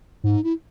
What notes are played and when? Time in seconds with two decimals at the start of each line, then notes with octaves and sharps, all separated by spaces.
0.24 G#2 D#4
0.44 E4